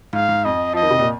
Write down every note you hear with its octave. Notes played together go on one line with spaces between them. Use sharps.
G#2 F5
G#2
F2 D#5
F3 D#5
D#3
C3
A#2